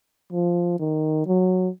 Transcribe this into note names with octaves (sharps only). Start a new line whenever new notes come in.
F3
D#3
F#3